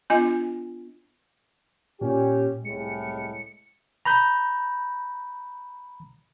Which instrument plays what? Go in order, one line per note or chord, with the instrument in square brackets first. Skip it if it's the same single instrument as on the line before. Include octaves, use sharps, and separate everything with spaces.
[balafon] B3 D4 F4 D#5 G#5
[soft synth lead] A#2 [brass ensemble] C#4 G4
[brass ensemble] C2 A2 G#3 [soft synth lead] C#7
[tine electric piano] A#5 B5 G6